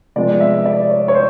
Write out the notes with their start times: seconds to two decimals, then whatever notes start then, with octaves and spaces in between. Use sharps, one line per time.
0.16 C3 F3 G#3 B3 D5
0.40 E5
0.66 D5
0.90 C#5
1.08 C#5
1.15 C5